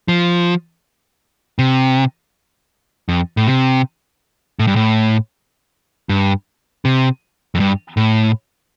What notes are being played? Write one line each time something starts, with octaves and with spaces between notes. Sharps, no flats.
F3
C3
F2
A2
C3
A2
G2
A2
G2
C3
F2
G2
A2